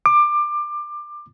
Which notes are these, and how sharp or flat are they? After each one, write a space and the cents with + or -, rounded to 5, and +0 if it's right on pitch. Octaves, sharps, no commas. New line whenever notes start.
D6 +20